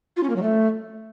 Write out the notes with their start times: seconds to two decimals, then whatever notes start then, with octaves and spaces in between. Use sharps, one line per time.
0.17 F4
0.23 C#4
0.30 A#3
0.36 F#3
0.43 A3